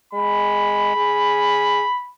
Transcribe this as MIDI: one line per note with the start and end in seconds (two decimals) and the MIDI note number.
0.14 0.94 56
0.14 2.10 83
0.96 1.85 68